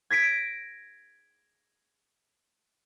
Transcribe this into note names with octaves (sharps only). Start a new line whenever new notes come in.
G#6 A#6 B6 D7